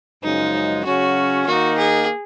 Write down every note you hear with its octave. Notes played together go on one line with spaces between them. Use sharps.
F#2 C#3 F3 G#3 D#4
C#3 F#3 C#4 F#4
D#3 A#3 D#4 F#4
G#4